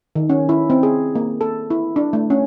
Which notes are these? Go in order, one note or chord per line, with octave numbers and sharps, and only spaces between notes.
D#3
C#4
E4
C4
G#4
A#3
A4
E4
D4
A3
C#4